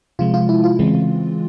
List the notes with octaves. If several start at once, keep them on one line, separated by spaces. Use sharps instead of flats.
C3 F3 G#3 F4
F4
E4
F4
C#3 E3 G#3 C4